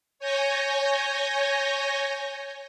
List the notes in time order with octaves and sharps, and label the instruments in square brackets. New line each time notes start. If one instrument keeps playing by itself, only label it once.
[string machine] C#5 G#5 G6 A#6